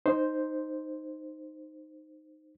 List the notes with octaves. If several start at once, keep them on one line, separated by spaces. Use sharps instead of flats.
D#4 C5